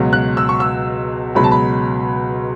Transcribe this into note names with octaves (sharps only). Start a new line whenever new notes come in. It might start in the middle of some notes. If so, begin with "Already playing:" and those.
Already playing: C#2 B2 F#3
F#6
E6
C#6
E6
C#2 B2 F#3 B5
A5
B5